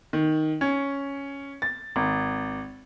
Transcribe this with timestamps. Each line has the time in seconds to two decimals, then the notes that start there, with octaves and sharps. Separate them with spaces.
0.13 D#3
0.61 C#4
1.62 A6
1.96 G#1